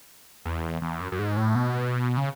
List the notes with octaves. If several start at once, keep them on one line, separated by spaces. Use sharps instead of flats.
E2
E2
F#2
F#2
G#2
A2
B2
C#3